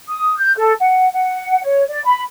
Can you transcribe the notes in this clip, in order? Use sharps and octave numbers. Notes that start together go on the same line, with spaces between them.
D#6
G6
A4
F#5
F#5
C#5
D5
B5